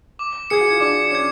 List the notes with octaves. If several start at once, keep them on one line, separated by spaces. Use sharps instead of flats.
D6
G#4 G#6 C#7
F#4
F4
D4 D6
C#4 G#6 C#7